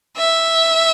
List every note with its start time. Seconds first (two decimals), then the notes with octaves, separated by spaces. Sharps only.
0.18 E5